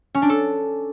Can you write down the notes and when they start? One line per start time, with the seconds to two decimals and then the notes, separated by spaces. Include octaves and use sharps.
0.15 C#4
0.22 D4
0.29 A4